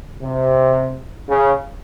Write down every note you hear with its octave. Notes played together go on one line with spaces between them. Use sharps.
C3
C#3